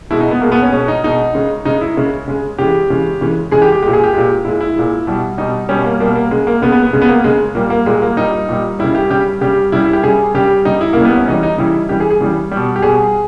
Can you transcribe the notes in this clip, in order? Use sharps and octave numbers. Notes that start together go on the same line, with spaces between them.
B2 G#3 E4
D#4
B3
B2 G#3 A#3
B3
C#4
B2 G#3 C#4
D#4
B2 G#3 D#4
C#3 G#3
C#3 G#3 D#4
E4
C#3 G#3
C#3 G#3
C#3 E3 G#3 G4
C#3 E3 G#3
C#3 E3 G#3
C#3 E3 G#3 G#4
G4
G4
A#2 G#3 G4
G#4
G4
A#2 G#3
A#2 G#3 E4
E4
A#2 G#3
B2 G3
B2 G3 D#4
B2 G3 C#4
A#3
B2 G3 A#3
A#3
C#3 G#3
A#3
C#3 G#3 B3
B3
B3
C#3 G#3
B3
A#3
C#3 G#3
A#2 G3 A#3
A#3
A#2 G3 G#3
A#3
A#2 G3 D#4
A#2 G3
C#3 G3 E4
G4
C#3 G3 G4
C#3 G3 G4
C#3 G3 E4
E4
G4
C#3 G3 G#4
C#3 G3 G4
C#3 G3 D#4
E4
C#3 A#3
G3 B3
C#4
C#3 E3 G3 D#4
D#4
C#3 E3 G3 E4
C#3 E3 G3 G4
G#4
G#4
C#3 E3 G3
B2 G3
G4
B2 G3 G#4